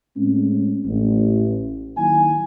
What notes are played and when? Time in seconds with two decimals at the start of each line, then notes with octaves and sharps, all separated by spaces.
0.16 A2 G#3 C4 C#4
0.86 A1
1.97 D#3 F#3 A#3 E4 G#5